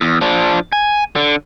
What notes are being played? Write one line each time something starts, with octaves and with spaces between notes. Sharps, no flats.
E2
F3 D4
G#5
D3